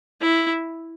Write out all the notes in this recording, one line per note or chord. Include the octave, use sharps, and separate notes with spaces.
E4